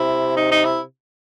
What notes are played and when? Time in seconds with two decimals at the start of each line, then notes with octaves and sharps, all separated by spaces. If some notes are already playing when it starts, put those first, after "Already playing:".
Already playing: C3 E4
0.37 D#4
0.51 D#4
0.65 E4